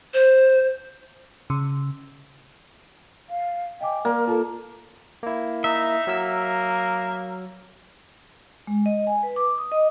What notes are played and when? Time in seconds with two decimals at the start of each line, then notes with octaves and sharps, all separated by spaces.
0.14 C5
1.50 C#3
3.30 F5
3.81 D#5 G5 G#5 D6
4.05 A#3 A#4 D5
4.27 F4 A4 A5
5.23 A#3 E4
5.64 D#4 E5
6.07 F#3 A#3 E6
8.67 G#3
8.86 D#5
9.07 G#5
9.23 B4
9.36 D6
9.58 D#6
9.72 D#5